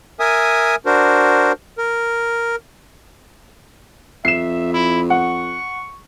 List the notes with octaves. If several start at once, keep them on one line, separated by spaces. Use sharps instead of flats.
A#4 E5 G#5 D#6
D4 F#4 A#4 C5
A#4
F2 E5 C7 E7
E4
F#5 C#6